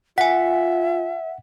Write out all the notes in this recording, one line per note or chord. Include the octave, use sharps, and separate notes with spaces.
F4 E5 F#5 G#5 B6